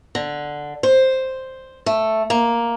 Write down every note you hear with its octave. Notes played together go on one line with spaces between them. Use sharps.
D3
C5
A3
A#3